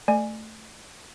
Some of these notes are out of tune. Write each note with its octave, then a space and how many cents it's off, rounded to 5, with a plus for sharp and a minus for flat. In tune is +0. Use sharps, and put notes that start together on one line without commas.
A3 +0 D5 +35 G#5 +0